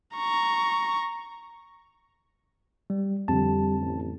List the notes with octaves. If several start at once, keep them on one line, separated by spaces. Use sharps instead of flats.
A#5 C#6
G3
F2 D3 G3 C4 A5
A1